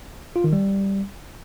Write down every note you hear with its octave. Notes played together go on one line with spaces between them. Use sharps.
F4
D#3
G3